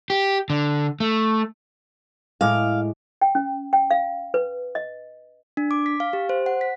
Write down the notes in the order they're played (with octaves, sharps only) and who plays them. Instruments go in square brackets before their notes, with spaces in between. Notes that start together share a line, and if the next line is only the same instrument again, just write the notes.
[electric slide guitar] G4
D3
A3
[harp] A2 G#3 D6 [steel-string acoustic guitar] F5
[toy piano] G5
C#4
G5
F5
B4
D#5
[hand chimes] D4
D6
B6
F5
G4
C5
F#5
B6